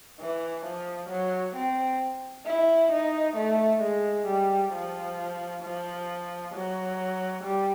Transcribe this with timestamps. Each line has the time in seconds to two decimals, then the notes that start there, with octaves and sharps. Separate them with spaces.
0.20 E3
0.66 F3
1.10 F#3
1.56 C4
2.46 E4
2.92 D#4
3.37 A3
3.82 G#3
4.27 G3
4.73 F3
5.64 F3
6.54 F#3
7.44 G3